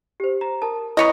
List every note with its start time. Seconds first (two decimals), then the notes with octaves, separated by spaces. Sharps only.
0.20 G4 C5
0.41 A#5
0.62 A#4 A5
0.97 E4 B4 C#5 D#5 A#5